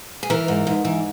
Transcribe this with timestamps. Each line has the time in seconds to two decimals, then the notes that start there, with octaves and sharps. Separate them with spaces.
0.23 G#4
0.30 E3 A#4
0.48 G#2
0.67 G#2
0.85 E3